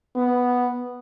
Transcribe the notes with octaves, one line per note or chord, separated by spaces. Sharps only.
B3